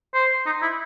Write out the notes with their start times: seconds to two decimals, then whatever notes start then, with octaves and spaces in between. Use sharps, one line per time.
0.14 C5
0.46 D#4
0.62 E4